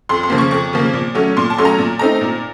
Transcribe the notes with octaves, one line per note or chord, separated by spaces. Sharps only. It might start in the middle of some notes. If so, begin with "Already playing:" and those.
F2 C6
C6
C#3 F3 A#3
C#6
F2 C#6
C#3 F3 A#3
A#2
F#3 A3 C#4
A#2 C6
A5
F#3 A3 C#4 C6
A#5
A#2
A3 C4 D#4 A#5
A#2